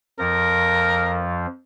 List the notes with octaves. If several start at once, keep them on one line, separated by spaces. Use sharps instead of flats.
F2 F3 A#4